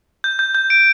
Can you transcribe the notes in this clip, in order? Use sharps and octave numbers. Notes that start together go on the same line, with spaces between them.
G6
G6
G6
D7